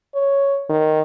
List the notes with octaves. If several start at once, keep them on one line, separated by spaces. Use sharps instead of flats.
C#5
D#3